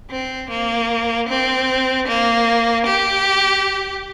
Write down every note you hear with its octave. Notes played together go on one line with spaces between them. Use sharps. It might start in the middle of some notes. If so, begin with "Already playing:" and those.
C4
A#3
C4
A#3
G4